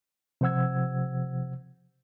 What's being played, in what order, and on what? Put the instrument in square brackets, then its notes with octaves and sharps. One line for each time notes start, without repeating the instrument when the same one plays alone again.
[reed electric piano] C3 F3 C5 F#5 E6 G#6